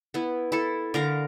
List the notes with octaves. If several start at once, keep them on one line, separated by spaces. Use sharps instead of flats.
B3 E4
E4 A4
D3 A#4 F5 A#5